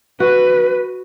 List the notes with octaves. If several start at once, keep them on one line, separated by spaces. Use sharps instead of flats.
F#4 B4